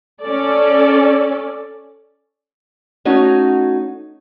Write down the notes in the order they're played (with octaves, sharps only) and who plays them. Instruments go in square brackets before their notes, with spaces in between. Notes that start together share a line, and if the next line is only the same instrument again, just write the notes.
[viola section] C#4 A4 D5
[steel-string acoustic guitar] A3 C#4 D#4 F#4